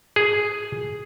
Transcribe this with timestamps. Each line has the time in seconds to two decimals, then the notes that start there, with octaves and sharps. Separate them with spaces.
0.16 G#4